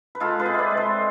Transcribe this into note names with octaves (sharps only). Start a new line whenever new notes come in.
B4
G#3 F4 A4
G#4 B4
C4
B4 D5 E5
G#3
A4 C5